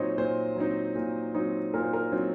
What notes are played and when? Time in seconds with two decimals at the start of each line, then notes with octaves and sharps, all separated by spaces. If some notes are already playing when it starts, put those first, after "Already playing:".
Already playing: A#2 F#3 C4 D#4 C5 C#5 D#5
0.18 A#2 C5
0.56 F#3 C4 D#4
0.96 A#2
1.34 F#3 C4 D#4
1.74 A#2 A#4
1.83 C5
1.93 A#4
2.12 F#3 C4 D#4